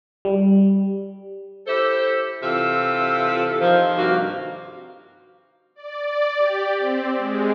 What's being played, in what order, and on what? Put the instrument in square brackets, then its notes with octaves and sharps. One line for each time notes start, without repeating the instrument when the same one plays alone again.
[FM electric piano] G3
[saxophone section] E4 G4 A4 C5 E5
C3 E3 F4 A4 E5
D#3 F3
G2 C3 A#3 F#4 F5
[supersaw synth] D5
D5
G4
C4
G#3